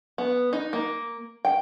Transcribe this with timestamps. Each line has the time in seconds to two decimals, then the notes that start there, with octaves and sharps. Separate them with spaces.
0.18 B3
0.53 D#4
0.73 A#3
1.45 G5